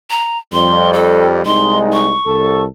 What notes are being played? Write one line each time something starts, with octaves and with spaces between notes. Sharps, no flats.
A#5
F2 G3 C6
A4
C2 G#3 D#4 C6
C#6
C2 A4